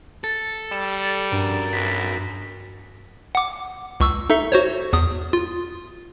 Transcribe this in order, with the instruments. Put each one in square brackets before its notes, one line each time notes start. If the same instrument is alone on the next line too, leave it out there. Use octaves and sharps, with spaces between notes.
[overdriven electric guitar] A4 [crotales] A6
[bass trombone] G3 [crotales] E7
[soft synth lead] G2 [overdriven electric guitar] F#4 A#4
[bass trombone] B1 [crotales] A#6 B6
[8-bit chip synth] F#5 D6
C#2 C#6 E6
D#4 A4 E5
F#4 C5 C#5
E2 D#6
F4